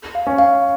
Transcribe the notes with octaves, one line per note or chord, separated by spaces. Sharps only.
F5
C#4
F5